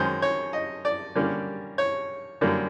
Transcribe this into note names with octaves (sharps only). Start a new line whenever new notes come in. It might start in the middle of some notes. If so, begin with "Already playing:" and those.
Already playing: F#2 D#3 G#3 C#4 C5
C#5
D#5
D5
D3 G3 A#3 C#4
C#5
F#2 D3 G3 A#3